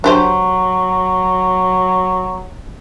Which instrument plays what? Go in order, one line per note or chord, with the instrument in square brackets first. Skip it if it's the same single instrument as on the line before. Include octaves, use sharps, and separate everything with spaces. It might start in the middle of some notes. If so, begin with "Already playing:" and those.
[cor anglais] F#3 [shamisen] D4 G4 C5